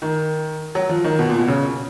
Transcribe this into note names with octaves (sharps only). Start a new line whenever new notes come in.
D#3
F#3
F3
D#3
B2
A#2
B2
C#3